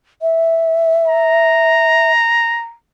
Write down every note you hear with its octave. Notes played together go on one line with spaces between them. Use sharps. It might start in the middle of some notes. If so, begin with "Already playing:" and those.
E5
A#5